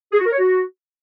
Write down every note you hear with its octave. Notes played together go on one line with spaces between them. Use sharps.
G#4
F#4
A#4
C#5
F#4